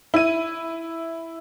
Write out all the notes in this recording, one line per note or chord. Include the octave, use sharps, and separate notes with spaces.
E4 D#7